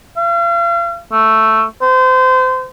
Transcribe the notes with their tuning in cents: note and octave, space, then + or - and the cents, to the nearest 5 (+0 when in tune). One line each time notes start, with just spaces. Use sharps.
F5 -40
A3 +5
C5 -30